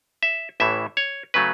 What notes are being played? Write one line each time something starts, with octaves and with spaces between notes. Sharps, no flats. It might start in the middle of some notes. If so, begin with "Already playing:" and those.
E5
A1 A2 E3 E5
C#5
C#3 F#3 A3 B4